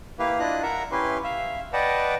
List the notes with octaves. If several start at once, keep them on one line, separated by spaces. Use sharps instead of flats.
A#3 E4 G4 B4 F5
D4 E4 F4 D#5 F#6
A#4 E5 F#5 A#5
C#4 E4 G4 B4 C6
E5 F5
B4 D5 D#5 F#5 G5 A5